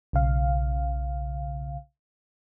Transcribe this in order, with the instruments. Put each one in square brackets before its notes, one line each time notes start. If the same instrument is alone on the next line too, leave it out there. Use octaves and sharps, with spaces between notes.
[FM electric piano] B1 C#3 F5